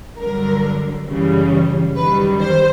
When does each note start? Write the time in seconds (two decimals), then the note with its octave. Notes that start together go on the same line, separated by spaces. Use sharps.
0.19 G2 D3 F#3 A#4
1.08 F#2 C#3 E3 G3
1.96 F#2 D#3 G3 B4
2.41 C5